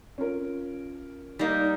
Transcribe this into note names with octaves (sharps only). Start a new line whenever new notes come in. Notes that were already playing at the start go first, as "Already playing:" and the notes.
C#4 F4 A#4
G3 A#3 D#4